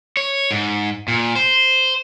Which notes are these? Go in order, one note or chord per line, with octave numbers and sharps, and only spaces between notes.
C#5
G#2
A#2
C5